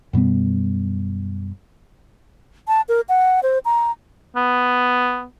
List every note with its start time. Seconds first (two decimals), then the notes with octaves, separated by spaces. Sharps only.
0.13 F#2 B2 G3 B3
2.68 A5
2.89 A#4
3.09 F#5
3.43 C5
3.65 A#5
4.36 B3